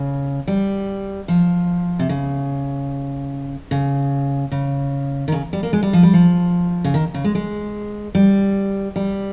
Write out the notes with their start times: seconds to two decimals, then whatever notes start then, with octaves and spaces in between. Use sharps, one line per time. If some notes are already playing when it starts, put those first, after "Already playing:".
Already playing: C#3
0.48 G3
1.28 F3
1.99 C3
2.09 C#3
3.71 C#3
4.52 C#3
5.28 D#3
5.32 C#3
5.53 G3
5.63 A#3
5.73 G#3
5.83 G3
5.93 F3
6.03 G3
6.14 F3
6.84 C#3
6.94 D#3
7.14 C#3
7.24 G#3
7.35 G#3
8.15 G3
8.96 G3